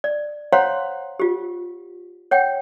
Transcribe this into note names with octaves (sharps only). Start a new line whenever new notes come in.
D5
C5 C#5 F5 F#5 A#5 C6
F4 G4
C#5 F#5 G5